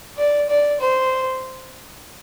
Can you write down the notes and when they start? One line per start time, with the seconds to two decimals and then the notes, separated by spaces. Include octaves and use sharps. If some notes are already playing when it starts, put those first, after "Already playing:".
0.18 D5
0.49 D5
0.81 C5